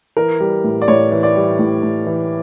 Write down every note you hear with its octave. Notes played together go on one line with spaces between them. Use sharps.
E3 A#4
G3
A2
D5
A2 C#5
E3
D5
G3
A2
A2
E3